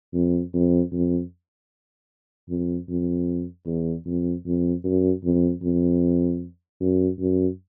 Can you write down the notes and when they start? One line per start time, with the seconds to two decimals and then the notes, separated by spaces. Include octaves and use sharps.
0.13 F2
0.53 F2
0.92 F2
2.49 F2
2.89 F2
3.66 E2
4.06 F2
4.46 F2
4.84 F#2
5.24 F2
5.62 F2
6.81 F#2
7.20 F#2